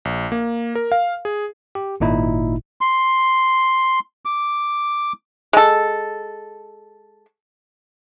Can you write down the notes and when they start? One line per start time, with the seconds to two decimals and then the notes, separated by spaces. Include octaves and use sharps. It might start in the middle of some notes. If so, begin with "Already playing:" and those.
0.05 A#1
0.32 A#3
0.75 A#4
0.92 F5
1.25 G#4
1.75 G4
2.00 G#1 A#2 D#4 E4
2.81 C6
4.25 D6
5.53 G#3 A4